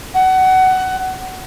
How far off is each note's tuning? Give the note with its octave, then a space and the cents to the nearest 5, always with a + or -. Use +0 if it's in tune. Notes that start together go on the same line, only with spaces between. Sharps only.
F#5 +20